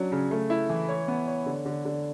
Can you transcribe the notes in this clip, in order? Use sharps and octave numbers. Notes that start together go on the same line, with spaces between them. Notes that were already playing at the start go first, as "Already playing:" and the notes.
Already playing: F#3 C#4 D4
C#3
A3
E4
E3
C#5
B3
C#5
D3
D3
D3